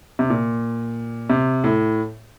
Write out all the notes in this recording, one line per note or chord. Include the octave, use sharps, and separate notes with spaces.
C3
A#2
C3
A2